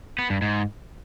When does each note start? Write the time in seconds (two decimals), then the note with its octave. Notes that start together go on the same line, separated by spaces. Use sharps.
0.19 B3
0.30 G2
0.42 G#2